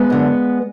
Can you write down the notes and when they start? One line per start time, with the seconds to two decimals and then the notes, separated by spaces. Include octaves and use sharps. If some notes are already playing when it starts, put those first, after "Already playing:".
Already playing: G#3 B3
0.10 F#2 D3